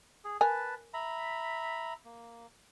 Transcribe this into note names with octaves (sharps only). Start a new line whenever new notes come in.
G#4
A#4 B4 G#5 A5
E5 A#5 B5
A#3